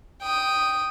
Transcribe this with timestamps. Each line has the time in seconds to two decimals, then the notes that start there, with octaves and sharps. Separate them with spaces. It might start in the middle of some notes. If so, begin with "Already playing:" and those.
0.22 G5 D#6